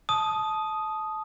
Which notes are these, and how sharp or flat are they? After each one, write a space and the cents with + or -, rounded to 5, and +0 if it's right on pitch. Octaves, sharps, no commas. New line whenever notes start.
A5 -20 D#6 +0